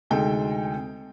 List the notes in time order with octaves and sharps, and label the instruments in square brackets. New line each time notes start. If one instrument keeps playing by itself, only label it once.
[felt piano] D2 C3 G#3 D#4 A4 G5